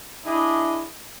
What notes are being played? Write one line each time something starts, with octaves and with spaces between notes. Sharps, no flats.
D4 E4 G#4 D#5